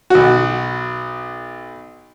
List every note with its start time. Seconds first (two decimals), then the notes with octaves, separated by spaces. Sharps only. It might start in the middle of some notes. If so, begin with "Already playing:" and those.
0.10 B1 F#4